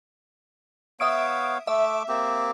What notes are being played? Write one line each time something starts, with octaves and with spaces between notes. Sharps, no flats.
B3 C#5 E5 F5 D#6 D7
A3 E5 D6
A#3 C4 G4